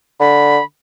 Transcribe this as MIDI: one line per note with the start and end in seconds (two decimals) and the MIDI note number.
0.20 0.58 50
0.20 0.63 83